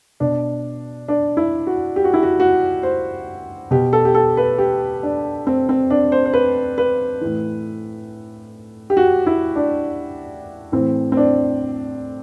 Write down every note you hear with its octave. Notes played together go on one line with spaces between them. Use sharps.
B2 D4
D4
E4
F#4
G4
F#4
E4
F#4
F#4
C5
B2 G4
A4
G4
A4
B4
G4
D4
C4
C4
D4
C5
C5
B4
B4
A2 E3
G4
F#4
E4
D4
A2 E3 C4
C4
D4